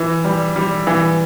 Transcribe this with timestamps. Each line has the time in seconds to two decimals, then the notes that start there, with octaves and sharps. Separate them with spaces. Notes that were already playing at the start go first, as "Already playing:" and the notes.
Already playing: E3
0.24 G3
0.56 G3
0.87 E3